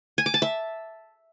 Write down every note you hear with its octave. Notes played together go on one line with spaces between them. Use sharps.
G#5
D6
A5
E5